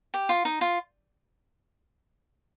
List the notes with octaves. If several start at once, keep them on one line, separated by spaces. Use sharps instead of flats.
G4
F4
D#4
F4